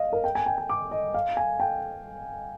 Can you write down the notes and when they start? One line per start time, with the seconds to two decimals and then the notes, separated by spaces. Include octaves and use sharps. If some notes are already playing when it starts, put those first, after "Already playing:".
Already playing: D#5 F5
0.13 A#4
0.24 G5
0.35 G#5
0.46 G5
0.58 G#5
0.69 D6
0.91 D#5
1.14 F5
1.37 G#5
1.60 G5